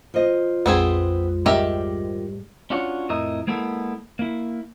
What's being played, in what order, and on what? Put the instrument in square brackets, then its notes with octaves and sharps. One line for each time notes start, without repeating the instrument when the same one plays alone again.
[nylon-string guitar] F3 D#5
[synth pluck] A#1 F2 G#3 [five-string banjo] B3 C4 G#4
[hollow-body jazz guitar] G#2 G3 [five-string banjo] D#3 G4 E5
[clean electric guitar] C#4 D4 F4 F#4 C#5
F2 A2 E4 A#4 D#5
G#3 A#3 B3 E4 A4
A#3 E4